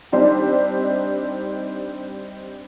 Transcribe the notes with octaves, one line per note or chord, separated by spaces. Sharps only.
G3 C4 D4 D#4